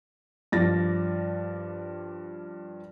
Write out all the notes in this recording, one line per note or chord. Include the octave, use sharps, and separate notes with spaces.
G2 F3 D5 A6 A#6